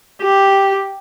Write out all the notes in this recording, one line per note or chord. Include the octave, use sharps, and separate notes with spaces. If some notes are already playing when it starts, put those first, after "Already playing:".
G4